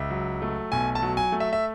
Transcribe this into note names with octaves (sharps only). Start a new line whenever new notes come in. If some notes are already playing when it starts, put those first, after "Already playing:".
Already playing: C#2 E5
F#3
A3
B1 G#5
A5
F#3
G#5
A3
E5
E5